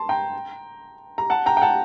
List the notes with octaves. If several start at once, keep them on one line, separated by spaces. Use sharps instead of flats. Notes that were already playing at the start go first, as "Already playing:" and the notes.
Already playing: A5 C6
G5 A#5
A#5
F#5 A5
G5 A#5
G5
F#5 A5